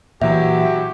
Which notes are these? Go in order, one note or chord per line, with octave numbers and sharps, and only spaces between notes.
A#2 E3 F#3 E4 G4 E5